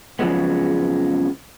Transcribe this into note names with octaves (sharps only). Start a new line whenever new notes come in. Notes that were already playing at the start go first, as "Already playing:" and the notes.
F2 C#3 F3 F#3 G#3 B3